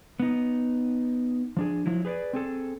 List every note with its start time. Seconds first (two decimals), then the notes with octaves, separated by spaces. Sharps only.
0.20 B3 D#4
1.57 F3 D4 G#4
1.86 F3 F#3 E4
2.05 G#4 B4 C5 D5
2.33 C4 G#4 A4